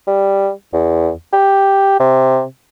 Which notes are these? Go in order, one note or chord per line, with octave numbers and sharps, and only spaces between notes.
G3
E2
G4
C3